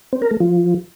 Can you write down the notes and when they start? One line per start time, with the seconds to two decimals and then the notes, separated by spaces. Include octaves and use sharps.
0.13 C4
0.22 A#4
0.31 A3
0.40 F3